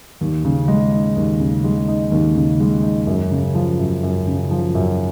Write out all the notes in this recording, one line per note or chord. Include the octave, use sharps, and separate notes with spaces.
D#2
C#3
G#3
D#4
D#2
C#3
G#3
D#4
D#2
C#3
G#3
D#4
F#2
C#3
F3
F#2
F#2
C#3
F3
F#2